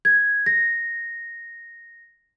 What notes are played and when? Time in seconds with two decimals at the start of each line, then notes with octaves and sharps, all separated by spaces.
0.05 G#6
0.46 A#6